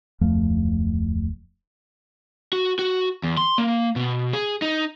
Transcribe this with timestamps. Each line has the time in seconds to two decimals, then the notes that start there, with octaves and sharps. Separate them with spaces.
0.21 D1 F2 F3 A3
2.53 F#4
2.79 F#4
3.23 E2
3.37 C6
3.58 A#3
3.96 B2
4.33 G#4
4.62 D#4